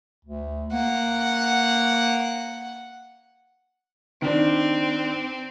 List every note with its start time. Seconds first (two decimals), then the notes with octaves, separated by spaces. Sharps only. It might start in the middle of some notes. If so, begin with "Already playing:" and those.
0.25 D2
0.73 A#3 F#5
4.22 D#3 C4 D4